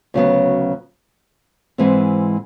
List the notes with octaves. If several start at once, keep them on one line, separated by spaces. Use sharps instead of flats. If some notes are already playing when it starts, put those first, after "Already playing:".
D2 C#3 F#3 B3
G#2 E3 G#3 C4